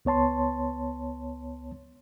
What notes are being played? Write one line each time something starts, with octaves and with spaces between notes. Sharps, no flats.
C#2 B3 C#5 A5 C6